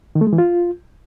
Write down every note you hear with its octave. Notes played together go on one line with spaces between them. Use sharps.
D#3
A3
G#3
E3
F4